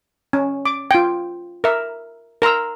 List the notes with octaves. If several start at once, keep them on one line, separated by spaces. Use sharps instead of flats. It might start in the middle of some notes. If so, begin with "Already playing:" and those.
C#4
D6
F4 G5
A#4 E5
A#4 A#5 C6 E6